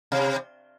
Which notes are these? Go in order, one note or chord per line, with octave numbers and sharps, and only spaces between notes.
C3